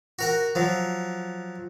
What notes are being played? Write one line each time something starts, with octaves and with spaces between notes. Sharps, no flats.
F#4 A#4 F#5
F3 F#3